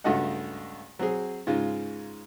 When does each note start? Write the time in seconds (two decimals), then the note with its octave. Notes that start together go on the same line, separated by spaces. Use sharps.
0.04 C#2 G2 A3 F#4 D#5 F#5
0.99 F#3 C4 G#4
1.47 G#2 C#3 G#3 F4